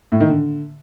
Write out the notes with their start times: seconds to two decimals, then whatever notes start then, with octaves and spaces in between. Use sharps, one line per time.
0.12 A2
0.20 D#3
0.29 D3